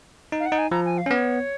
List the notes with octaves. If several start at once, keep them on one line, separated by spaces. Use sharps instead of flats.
D#4
F5
F#5
D#4
G#5
F3 A#5
G#5
F5
C#4
B3 C#5